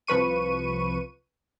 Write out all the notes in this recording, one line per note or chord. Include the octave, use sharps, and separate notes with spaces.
C2 F3 B4 C#6 D#7